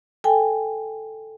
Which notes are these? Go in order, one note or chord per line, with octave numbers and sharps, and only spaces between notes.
A4 G5 G#5